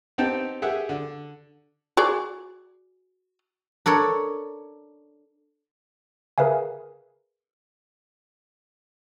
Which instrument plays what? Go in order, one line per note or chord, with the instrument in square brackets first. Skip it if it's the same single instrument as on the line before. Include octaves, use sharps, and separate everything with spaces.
[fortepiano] B3 C4 D#4 G4 G5 A5
G4 G#4 E5 F#5
D3
[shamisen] F#4 G#4 D5
[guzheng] D4 A4 A#4 C#5
[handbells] G#4 A#4 B4 E5 F5 G#5